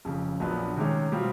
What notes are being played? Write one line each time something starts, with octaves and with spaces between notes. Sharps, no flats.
F1 F2 C#3
A#1 A#2 F#3 B3 D4
C3 D#3 G#3 C#4
B2 G3 C4 F4